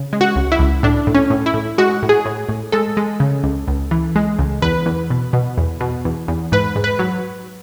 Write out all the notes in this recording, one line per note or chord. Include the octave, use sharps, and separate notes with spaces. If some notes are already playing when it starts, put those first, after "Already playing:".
Already playing: C#3
G#3
F#4
C#2
E4
C#2
A2 D4
A2
C#4
A2
E4
A2
G#3 F#4
A2
G#4
A2
A2
G#3 A4
G#3
C#3
C#2
C#2
E3
G#3
C#2
E2 B4
E2
B2
B2
E2
B2
E2
E2
G#2 B4
G#2
B4
F#3